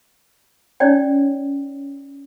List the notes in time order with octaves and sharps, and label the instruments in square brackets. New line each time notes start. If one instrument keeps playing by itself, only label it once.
[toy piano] C#4 D#4 E4 C#5 D5 G5